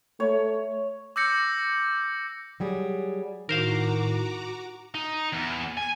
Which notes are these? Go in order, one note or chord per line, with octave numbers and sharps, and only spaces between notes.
A3 C#5
D6 E6 G6 A#6 C#7
F#3 G3 G#4
A2 D#3 F#4 A#4 C5 F5 A#5 D6
D#4
E2
G#5